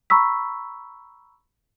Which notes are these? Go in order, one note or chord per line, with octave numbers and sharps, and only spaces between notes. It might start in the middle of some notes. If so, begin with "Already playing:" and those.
A#5 B5 C#6 E6 B6